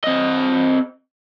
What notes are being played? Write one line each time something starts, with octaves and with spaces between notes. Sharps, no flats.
C4 D#5